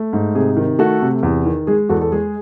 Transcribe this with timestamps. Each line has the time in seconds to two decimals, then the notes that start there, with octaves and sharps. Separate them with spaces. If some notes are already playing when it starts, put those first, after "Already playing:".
Already playing: A3
0.13 G#2
0.35 C3 G#4
0.57 D#3
0.79 A3 F#4 A4
1.02 C3
1.23 E2
1.46 D#3
1.67 G#3 G#4
1.89 E2 F#4 A4
2.01 A4
2.12 G#3 G#4